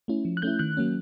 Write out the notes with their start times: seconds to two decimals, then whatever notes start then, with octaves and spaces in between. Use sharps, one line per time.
0.08 A3 C#4 E4
0.25 F3
0.37 F#6
0.42 A3 C#4 E4 G6
0.59 D#3 F#6
0.77 F#3 A#3 C#4